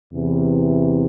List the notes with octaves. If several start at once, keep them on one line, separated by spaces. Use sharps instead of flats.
E2 C3 E3